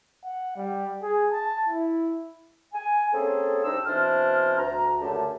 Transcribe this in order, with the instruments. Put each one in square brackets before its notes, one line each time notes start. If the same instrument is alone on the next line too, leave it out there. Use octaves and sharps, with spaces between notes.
[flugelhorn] F#5
G3
G#4
A5
E4
[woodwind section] G#5
A#3 C4 C#4 G#4 A4
C2 C4 D4 D#4 E6
B2 E3 C4 D4 C5 F6
D2 A#5
C#2 F#2 D3 A3 G4 A5